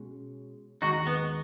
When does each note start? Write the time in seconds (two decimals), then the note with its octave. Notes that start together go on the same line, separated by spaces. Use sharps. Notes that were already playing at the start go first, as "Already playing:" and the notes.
Already playing: B2 G#3 C#4
0.81 D#2 D#3 G#3 D#4 F#4
1.07 B3